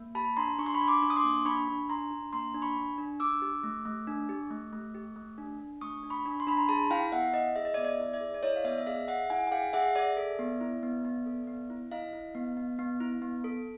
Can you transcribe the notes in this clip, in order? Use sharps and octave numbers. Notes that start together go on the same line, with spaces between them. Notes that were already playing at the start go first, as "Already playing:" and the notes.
Already playing: A#3
G4 A5 B5
D4 A#5 C6
D4 C#6
C6
B5 C#6
D4
C6 D6
D4
D#6
C6 D6
A#3
D4 B5 C#6
D4
D4 A#5 C6
D4
A#3 A#5 C6
D4
B5 C#6
D4
D4
D4 D6 E6
G4
A3
A3
D4
G4
A3
A3
G4
A3
D4
D4
A3 C#6 D#6
D4
B5 C#6
D4
C6
D4 B5
A#5 C6
G#4 A5 B5
E4 F5 G5
B3 E5 F#5
E4 D#5 F5
G#4 E5
D#5
D5 E5
B3
D5 E5
E4
D5 E5
G#4
D5
E4 C#5 D#5
F5
B3 D5 E5
E5
G#4 D#5 F5
G#4 E5 F#5
E4 F#5 G#5
G#5
G#4 F5 G5
G#4 E5 F#5
G#4 D5 E5
A4
B3
E4
B3
B3
A4
B3
E4
E4 D#5 F5
E4
B3
B3
B3
E4
B3
A4